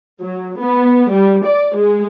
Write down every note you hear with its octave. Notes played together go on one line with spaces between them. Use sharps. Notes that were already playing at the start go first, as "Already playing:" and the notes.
F#3
B3
G3
D5
G#3